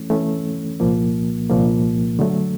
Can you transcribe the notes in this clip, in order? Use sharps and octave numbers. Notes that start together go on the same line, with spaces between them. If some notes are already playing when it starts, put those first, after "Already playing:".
Already playing: E3 A3 C#4
E3 A3 C#4
C2 A#2 F3 A#3
C2 A#2 F3 A#3
D3 F#3 A3